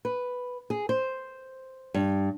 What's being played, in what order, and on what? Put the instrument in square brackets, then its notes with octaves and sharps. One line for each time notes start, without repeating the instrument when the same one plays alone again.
[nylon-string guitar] B4
G#4
C5
G2